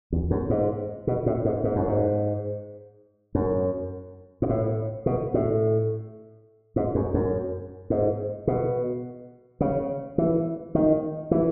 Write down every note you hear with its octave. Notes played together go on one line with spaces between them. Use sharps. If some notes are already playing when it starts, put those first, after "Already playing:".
E2
F#2
G#2
B2
A2
G#2
G#2
F#2
G#2
F#2
G#2
A2
B2
A2
G#2
F#2
F#2
G#2
B2
C#3
E3
D#3
E3